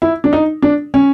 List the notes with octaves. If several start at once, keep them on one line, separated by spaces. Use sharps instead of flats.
E4
D4
D#4
D4
C#4